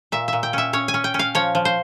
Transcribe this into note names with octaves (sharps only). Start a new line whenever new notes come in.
A#2 E5
A#2 E5
G5
C#4 E5
C#4 C#5
G#5
C#4
G5
C#4
F5
F3 C#5
F3
C5